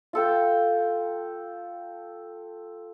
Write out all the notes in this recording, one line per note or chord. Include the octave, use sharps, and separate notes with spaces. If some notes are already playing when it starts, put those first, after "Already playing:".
F4 A4 G5